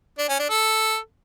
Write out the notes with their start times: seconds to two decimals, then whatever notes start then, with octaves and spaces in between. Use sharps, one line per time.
0.19 D4
0.29 C#4
0.39 D4
0.50 A4